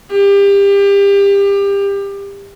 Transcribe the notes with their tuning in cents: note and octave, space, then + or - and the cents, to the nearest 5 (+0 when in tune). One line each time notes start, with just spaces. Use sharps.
G4 +25